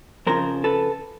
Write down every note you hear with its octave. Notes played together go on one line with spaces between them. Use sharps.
F2 C#3 F3 A#4 C5
A4 B4